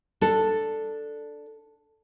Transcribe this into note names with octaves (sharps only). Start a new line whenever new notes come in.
D4 A4